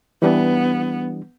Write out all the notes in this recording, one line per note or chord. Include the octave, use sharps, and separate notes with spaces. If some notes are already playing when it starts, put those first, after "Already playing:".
E3 G3 B3 D4